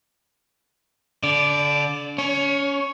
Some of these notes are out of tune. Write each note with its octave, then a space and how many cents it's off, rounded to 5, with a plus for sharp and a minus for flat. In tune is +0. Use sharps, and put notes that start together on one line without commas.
D3 -35 D5 +0
C#4 +25 C#5 +0